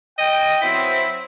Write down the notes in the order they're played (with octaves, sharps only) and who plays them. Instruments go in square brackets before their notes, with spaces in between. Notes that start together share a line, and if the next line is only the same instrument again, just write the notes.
[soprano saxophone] D#5 [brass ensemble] G5
[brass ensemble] F#3 B3 C4 [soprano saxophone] E4